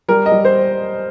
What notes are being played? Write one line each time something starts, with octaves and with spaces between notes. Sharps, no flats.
G3 A#4
D#5
G3
C5